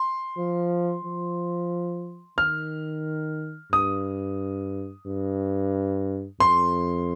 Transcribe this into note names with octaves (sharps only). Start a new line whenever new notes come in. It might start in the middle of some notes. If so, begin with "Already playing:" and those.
Already playing: C6
F3
F3
D#3 F6
G2 D#6
G2
F2 C6